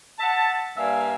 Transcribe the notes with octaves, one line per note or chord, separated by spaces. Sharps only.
E5 F#5 A5
G2 A#3 E5 F5 G#5